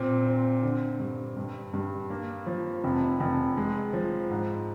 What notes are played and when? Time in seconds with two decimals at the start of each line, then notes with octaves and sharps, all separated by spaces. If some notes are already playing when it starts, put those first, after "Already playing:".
Already playing: A#2 C4
0.26 C4
0.63 D3
1.00 G2
1.37 G2
1.74 G2
2.10 A#3
2.47 F3
2.84 F1
3.20 F1
3.57 G#3
3.93 F3
4.30 G#2